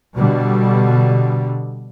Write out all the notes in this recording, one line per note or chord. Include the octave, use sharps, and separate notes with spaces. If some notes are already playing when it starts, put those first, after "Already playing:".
B2 D3 G3